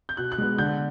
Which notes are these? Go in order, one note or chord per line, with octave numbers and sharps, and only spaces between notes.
G6
B2 F#6
F#6
G#3 B3
D3 G6